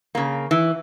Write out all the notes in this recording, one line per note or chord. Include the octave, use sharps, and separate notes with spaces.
C#3 A#3
E3